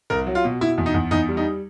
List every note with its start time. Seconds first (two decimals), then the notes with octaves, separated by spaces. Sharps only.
0.10 C2 A#4
0.27 F#3
0.35 F4
0.44 B2
0.61 B2 E4
0.78 E2
0.86 D#4
0.94 E2
1.11 E2 D#4
1.29 G3
1.37 D#4